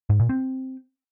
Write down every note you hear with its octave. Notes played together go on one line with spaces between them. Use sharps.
G#2
A#2
C4